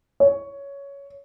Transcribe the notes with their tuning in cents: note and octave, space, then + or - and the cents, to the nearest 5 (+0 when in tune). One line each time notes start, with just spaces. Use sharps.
C#5 +10